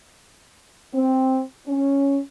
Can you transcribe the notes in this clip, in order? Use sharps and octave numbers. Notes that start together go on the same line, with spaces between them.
C4
C#4